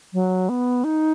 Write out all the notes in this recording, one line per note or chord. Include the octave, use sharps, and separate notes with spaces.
F#3
B3
D#4